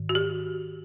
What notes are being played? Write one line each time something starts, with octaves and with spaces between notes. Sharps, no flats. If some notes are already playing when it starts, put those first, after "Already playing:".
Already playing: G#2 D#3
F#4
G4